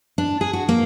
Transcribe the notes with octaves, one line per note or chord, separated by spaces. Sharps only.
D4
G#4
F#4
A#3